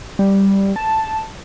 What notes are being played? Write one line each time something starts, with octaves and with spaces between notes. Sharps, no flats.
G3
A5